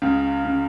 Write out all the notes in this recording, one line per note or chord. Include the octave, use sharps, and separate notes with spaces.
C#2 C#3
C#3